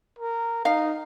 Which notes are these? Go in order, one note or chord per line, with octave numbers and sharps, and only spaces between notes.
A#4
D#4 F5